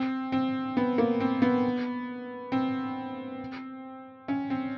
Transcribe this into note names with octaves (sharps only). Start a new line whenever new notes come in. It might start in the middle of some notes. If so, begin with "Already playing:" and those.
Already playing: C4
C4
B3
A#3
C4
B3
C4
C#4
C4